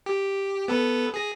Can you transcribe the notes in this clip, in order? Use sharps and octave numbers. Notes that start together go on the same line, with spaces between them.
G4
B3 A4 B4
G#4 A#6